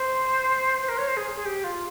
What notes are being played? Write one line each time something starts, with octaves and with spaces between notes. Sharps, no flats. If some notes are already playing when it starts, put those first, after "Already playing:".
Already playing: C5
C5
A#4
C#5
C5
G#4
G#4
G4
F4